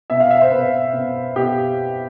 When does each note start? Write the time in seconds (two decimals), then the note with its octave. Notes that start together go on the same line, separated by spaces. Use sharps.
0.10 B2 E5
0.20 F5
0.31 E5
0.41 C5
0.51 B2 B4
0.93 B2
1.36 B2 G4